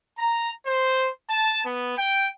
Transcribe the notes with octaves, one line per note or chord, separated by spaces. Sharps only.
A#5
C5
A5
B3
G5